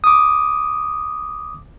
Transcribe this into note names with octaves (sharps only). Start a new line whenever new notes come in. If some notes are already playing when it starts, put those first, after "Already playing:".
D6 D#6